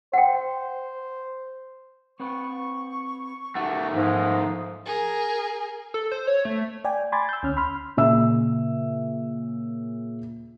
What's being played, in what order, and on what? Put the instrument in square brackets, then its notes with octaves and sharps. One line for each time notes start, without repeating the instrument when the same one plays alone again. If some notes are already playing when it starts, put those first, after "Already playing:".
[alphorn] C5 [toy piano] F#5 G5
[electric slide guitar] C4 B4 [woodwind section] C#6
[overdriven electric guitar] D#3 A3 [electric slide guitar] F#4 G4 F#5
[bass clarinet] G#2 [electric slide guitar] F3 [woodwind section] F5 D#6
[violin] G#4 A#4
[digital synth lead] A4
C5
C#5
A3
[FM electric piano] D5 G5 G#5
G#5 B5 C6 D6 G#6 A6
E6 G6
D2 C#4 F6
B5 C6 F6
[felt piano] A#2 C#3 E5 E6